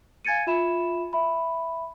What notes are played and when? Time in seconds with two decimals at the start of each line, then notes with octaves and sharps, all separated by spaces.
0.25 F5 G#5 G#6 A6 C#7 D#7
0.47 F4 E5 B5 E7
1.13 E5 B5